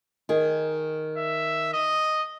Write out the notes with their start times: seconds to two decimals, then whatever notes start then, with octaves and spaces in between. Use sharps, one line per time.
0.29 D#3 G#4
1.17 E5
1.73 D#5